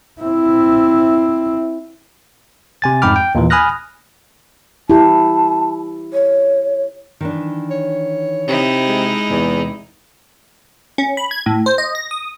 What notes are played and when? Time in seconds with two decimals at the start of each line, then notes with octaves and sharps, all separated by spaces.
0.21 C4 E4
2.82 C3 G#5 A6
3.02 F2 G#2 G5 B5 D6 F6
3.16 G5
3.35 D#2 A#2 E3
3.50 G#5 B5 D#6 F6 F#6 A#6
4.90 E4 G4 A5
6.13 C#5
7.21 D#3 E3 D4
7.71 C#5
8.48 C3 D#4 E4
8.88 G#3
9.30 E2 C3
10.98 C#4
11.17 B5
11.31 G#6
11.46 A2
11.66 C5
11.78 D#5
11.95 A#6
12.11 D#6